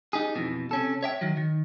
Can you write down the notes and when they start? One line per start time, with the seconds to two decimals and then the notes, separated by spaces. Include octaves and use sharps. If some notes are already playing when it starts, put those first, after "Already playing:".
0.13 D#4 G4 G#4
0.35 F2 B2 E3
0.71 C3 C#4 A4
1.03 C#5 E5 G5
1.21 D#3 F#3
1.37 D#3